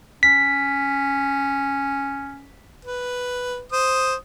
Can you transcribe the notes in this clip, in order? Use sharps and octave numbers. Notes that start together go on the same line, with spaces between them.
C#4 B6
B4
C5 D#6